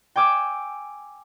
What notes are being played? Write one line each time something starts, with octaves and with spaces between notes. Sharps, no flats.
G5 G#5 D6 E6